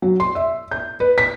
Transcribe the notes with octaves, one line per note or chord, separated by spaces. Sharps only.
F#3
C6
E5
G6
B4
B6